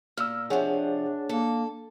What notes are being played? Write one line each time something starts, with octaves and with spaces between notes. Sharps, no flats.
A#2 E6 F6
C3 F3 D4 G#4 C#5 F#5
A#3 A4